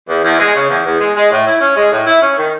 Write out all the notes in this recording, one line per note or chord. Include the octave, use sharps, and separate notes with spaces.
E2
E2
G#3
C#3
E2
E2
G#3
G#3
A2
E4
C#4
G#3
A2
E4
C#4
D#3